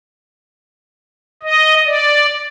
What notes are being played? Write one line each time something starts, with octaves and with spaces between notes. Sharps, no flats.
D#5
D5